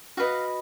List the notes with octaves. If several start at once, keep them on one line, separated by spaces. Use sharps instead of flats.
F#4 B4 D#5 F5